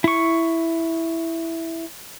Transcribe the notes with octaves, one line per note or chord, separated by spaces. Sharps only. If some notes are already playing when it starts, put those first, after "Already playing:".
E4 C#6